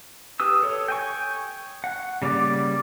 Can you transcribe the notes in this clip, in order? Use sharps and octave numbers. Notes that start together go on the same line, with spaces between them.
G4 B4 D#6 E6
A4 C#5
G5 G#5 C#6
F#5
C#3 G3 A#3 D5 D6